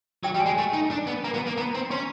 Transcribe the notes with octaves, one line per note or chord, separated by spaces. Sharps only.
F#3 G5
G3
G#5
G#3
A3
D#4
D4
B3
A#3 A#5
B3
A#3
B3 A#5
C4
C#4 C6